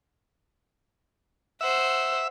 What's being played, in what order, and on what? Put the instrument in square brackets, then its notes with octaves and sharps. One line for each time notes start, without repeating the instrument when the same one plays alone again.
[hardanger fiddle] C5 F#5 [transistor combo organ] E5